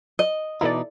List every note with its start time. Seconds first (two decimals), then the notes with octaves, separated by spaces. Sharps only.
0.19 D#5
0.61 B2 E3 D#4 E4 A4 D5